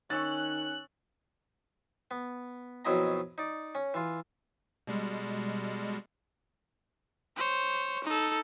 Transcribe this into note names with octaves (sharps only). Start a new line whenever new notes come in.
D#3 C#4 C#6 E6 F#6 A6
B3
F2 B2 F#3 E4 D#5 A#5
D#4 D5
C#4
E3 F4
B2 G3 G#3
C5 C#5
D#4 A4